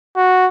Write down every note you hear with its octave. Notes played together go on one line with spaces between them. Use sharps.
F#4